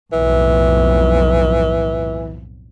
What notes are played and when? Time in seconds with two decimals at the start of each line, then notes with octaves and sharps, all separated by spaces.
0.12 B1 F2 A2 E3